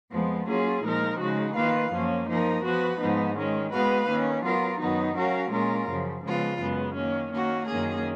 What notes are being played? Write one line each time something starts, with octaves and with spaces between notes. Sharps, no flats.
F2 F3 G#3 B3
F#3 A#3 C#4 F4 G#4
A#2 F3 G#3 D#4 A#4
C#3 G#3 D#4 F#4
D#3 A#3 F4 B4 F5
F#2 F3 A#3 C#4
F3 A#3 D#4 A#4
F3 B3 F#4 B4
G#2 F3 B3 D#4
D#3 G#3 C#4
G#3 B3 F#4 B4 F5
D#3 A#3 C#4
F#3 B3 F4 A#4
F#2 D#3 F#3 B3 D#4
F#3 C#4 F#4 A#4 F5
A#2 G#3 C#4 F4 A#4
F#2 C#3 F3
C#3 F3 G#3 B3 F4
F#2 C#3 G#3 B3
D#3 A#3 C#4
D#3 A#3 C#4 F#4
F#2 D#3 A#3 C#4 G#4